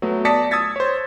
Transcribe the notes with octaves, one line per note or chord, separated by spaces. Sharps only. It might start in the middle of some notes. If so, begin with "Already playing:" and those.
F#3 A3 B3
D5 A5 D#6 A#6 B6 C#7
D#6 E6 G#6 A6 B6
C5 C#5